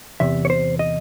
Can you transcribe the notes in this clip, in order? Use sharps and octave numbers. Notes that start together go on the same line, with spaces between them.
E2 C3 E5
C#5
C5
D#5